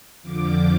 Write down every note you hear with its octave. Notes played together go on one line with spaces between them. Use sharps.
F2 D3 F3 D6